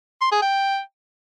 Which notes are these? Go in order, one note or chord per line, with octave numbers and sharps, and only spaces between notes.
C6
G#4
G5